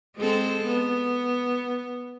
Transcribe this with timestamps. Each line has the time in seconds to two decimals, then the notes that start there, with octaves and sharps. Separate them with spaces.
0.17 G#3 C4 A4
0.66 B3